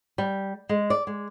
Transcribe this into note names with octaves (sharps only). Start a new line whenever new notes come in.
G3
G#3
D5
G#3